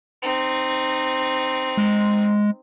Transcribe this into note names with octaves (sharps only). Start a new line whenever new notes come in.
C4 D#4
G#3